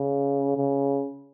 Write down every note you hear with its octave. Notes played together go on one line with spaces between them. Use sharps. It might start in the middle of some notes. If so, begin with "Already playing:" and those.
Already playing: C#3
C#3